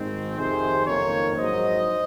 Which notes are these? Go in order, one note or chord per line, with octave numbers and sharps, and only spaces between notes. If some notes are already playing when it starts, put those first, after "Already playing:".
Already playing: G#1 G#2 D#3 G#3 C4
F2 C3 D#3 G#4 C5
F#1 F2 D#3 A#3 A#4 C#5
A#1 G#2 F#3 C5 D#5